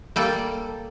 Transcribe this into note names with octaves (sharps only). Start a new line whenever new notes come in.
G3 A#3 A4